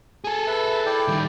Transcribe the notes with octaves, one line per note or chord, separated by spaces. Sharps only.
G#4 A4 G#5
B4 E5
E4 D5 G5
D#3 G3